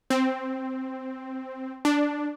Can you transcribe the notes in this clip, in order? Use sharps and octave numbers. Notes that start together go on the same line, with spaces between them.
C4
D4